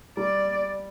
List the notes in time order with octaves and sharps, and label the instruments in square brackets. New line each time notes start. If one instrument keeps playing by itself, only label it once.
[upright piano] G3 [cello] D5